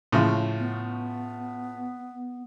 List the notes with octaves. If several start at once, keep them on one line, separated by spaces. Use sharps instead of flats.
A2 C#3 F3
B3